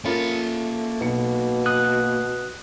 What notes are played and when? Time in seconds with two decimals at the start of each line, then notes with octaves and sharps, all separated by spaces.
0.04 A3 A#3 C#4 F4 A#4 B5
1.01 B1 B2 C#7
1.66 D#6 F#6